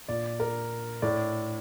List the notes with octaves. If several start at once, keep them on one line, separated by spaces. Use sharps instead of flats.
A#2 D5
A#4
A2 D5